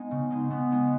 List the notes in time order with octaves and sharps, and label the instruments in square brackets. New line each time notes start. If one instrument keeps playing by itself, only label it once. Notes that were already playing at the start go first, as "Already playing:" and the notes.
Already playing: [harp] G#3 D#4 [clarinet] B3
[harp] C#3
G#3 D#4
[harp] C#3 [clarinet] B3
[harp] G#3 D#4